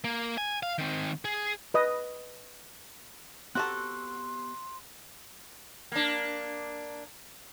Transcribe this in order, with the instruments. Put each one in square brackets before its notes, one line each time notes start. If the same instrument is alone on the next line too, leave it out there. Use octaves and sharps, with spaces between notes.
[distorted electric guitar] A#3
G#5
F5
D#3 C4
G#4
[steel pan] B4 D#5 D#6
[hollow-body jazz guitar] B3 G4 A#5 [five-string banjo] C4 F#4 A4 [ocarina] C6 [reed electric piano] F#6
[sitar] A#3 D4